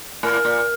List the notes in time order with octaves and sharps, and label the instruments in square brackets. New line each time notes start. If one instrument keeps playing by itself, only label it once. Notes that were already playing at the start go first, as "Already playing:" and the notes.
[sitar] A2 [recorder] A#4
[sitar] A#2